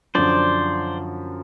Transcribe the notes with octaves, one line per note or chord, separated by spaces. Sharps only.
F#2 D3 F3 C5 D5